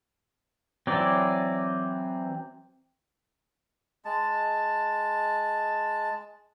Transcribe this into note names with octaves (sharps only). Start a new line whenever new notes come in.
E3 F#3 C4 D5
G#3 A5